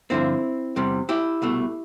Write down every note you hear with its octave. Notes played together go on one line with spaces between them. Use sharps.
G2 D3 F3 C4 E4
E2 C3 G3
E4 G4
C2 B2 A3